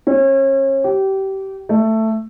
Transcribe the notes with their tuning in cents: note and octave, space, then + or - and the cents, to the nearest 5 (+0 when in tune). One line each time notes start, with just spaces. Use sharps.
C#4 -35
G4 -25
A3 +10